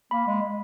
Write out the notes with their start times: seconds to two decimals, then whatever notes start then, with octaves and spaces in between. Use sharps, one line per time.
0.11 A#3 B5
0.27 G#3
0.42 G#3